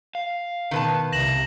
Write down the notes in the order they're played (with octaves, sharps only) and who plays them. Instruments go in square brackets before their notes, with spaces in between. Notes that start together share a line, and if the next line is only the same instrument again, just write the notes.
[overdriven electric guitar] F5
[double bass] B2 [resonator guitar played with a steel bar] D#3 B4 A5
[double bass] C2 C3 [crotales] A#6 E7 F#7